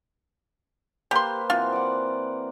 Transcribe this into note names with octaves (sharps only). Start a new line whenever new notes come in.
A#3 G4 B4 C5 C6
E3 C4 F4 F#4
D5 F#5